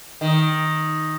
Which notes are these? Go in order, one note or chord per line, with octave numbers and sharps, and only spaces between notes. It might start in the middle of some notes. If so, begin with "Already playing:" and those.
D#3